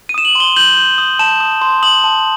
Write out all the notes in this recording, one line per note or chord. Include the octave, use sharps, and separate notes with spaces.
D#7
D#6 E7
F#7
C6 G7
G6 F#7
G6
D#6
A5 E7
D#6
C6
D#6 F#7
A5